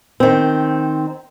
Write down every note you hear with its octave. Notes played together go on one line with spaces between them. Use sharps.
D#3 C4